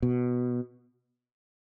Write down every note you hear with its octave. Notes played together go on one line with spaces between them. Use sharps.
B2